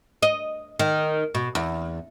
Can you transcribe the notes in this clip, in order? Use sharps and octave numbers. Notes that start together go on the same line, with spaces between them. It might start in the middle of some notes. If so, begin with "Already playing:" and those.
D#5
D#3
B2
E2